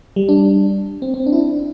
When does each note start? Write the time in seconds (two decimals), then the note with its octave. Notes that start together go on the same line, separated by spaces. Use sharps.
0.16 G3
0.29 D4
1.02 C4
1.14 C4
1.26 D4
1.33 E4
1.38 D4